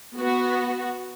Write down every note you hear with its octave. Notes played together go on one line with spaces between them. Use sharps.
B3 F#4